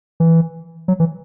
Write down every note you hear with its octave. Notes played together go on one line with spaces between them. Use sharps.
E3
F#3
E3